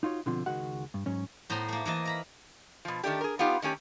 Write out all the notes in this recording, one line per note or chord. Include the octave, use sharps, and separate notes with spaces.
D#4 F4 F#4 C#5
B2 D3 F3 C4 F4
C#2 D#3 G#3 F#4 F#5
G2
G#2 F#3 C#4
A2 B3 C5 A#5 C6
A3 A#3
E3 A#3 D#5 A5
A#4 A#5 B5
B2 F3
D#3 A3 D4 G4
G#4 A#4
B3 D#4 F4 G4
D#3 A3 C#4 G4